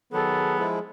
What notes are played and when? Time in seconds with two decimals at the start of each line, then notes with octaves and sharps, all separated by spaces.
0.13 D#3 F#3 B3 G#4 A4
0.59 F3 G#3 E4